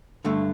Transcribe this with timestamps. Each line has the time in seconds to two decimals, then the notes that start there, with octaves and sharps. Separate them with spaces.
0.25 G2 D3 A3